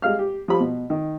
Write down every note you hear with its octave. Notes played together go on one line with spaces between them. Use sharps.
G3 G#3 F5 F6
G4
F3 G3 G4 B5
B2
D#3